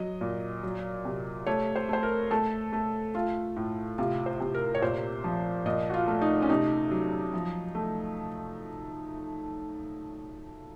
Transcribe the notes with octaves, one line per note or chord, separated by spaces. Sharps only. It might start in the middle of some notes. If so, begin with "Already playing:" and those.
Already playing: F#3 D#5
A#2
F#3
C3
A3 C#5
C5
A3 C5
A#4
A3 A4
A3
A3 F4
A2
C3 F4
C5
C3
A#4
C#5
A#2 C5
F3
A#2 D#5
F#4
F4
A3
D#4
C#4
C3 D#4
F#3
F3
A3